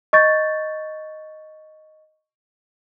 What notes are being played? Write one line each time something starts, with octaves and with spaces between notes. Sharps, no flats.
D#5 C#6 G6 A6